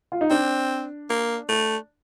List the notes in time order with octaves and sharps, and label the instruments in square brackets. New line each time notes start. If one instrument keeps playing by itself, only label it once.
[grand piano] F4
D#4
[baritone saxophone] C4 [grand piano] D4
[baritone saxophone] A#3
A3